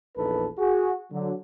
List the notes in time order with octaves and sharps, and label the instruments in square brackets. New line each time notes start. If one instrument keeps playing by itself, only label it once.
[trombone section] A#1 E2 D#4 A4 B4
F#4 G#4
D3 F#3